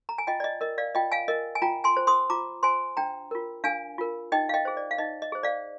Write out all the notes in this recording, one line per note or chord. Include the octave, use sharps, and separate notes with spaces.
A#5
G#5
F4 D#5 G5
D5
D#5
A#4 D#5
D5 F5
F4 D#5 G5
F5 G#5
A#4 D#5
G#5
F4 G5 A#5
G#5 C6
C5
C6 D#6
F4 A#5 D6
C5 G#5 C6
D4 G5 A#5
F4 A#4
D4 F5 G#5
F4 A#4
D#4 D#5 G5
F5
D#5 G5
G#4 C5
D5
F5
D#4 D#5
D#5
G#4 C5
D5 F5